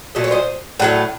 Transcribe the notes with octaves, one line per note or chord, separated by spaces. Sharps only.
A#2 F#3 A3 D#5
C#5
C5 D#5
A2 F#3 A3 F#5